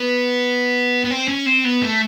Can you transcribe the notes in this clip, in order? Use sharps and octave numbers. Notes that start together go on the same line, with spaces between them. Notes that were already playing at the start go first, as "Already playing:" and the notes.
Already playing: B3
B3
C4
C#4
C4
B3
A3